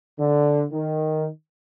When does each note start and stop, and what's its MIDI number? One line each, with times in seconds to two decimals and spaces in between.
0.20 0.65 50
0.72 1.28 51